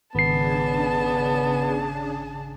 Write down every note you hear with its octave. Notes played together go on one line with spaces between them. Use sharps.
G#1 C#3 B3 D4 G#4 A5 C7